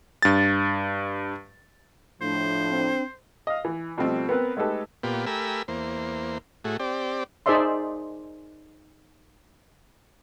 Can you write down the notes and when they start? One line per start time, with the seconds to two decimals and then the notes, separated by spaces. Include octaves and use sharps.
0.22 G2 A6
2.21 A2 F3 D4 C5
2.71 C4
3.47 D#5 F5
3.65 E3
3.98 B2 F3 G3 A3 C4
4.29 B3 C4 A#4 B4
4.57 G#3 A3 D#4 G4 A4 B4
5.03 A#2 B3 F4 G4
5.26 A3 G4 A#4 G#5 B5 E6
5.68 E2 A#3 C5
6.64 A2 A3 F#4 G#4
6.79 C4 G4 D5
7.46 D#4 G#4 C5 D5 E5 C6